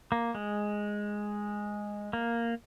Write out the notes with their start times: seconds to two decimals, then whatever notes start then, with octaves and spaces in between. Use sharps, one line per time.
0.12 A#3
0.35 G#3
2.13 A#3